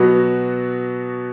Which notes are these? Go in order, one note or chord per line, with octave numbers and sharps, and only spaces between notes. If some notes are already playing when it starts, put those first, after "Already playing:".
Already playing: B2 F#3 B3 F#4